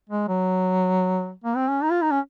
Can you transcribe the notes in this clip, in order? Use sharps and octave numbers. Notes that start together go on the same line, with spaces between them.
G#3
F#3
A#3
C4
C#4
D#4
F4
D#4
C#4